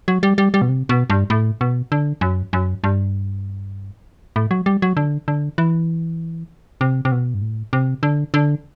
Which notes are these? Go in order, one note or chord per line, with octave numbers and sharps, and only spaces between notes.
F#3
G3
G3
G3
B2
C3
B2
G2
A2
B2
D3
F#2
F#2
G2
A2
F#3
G3
F#3
D3
D3
E3
C3
C3
B2
G2
A2
C3
D3
D3